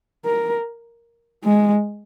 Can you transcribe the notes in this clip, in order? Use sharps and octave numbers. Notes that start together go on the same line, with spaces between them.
A#4
G#3